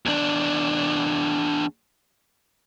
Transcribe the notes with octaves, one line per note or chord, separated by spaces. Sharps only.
E2 D4